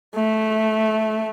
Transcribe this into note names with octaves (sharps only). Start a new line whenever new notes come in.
A3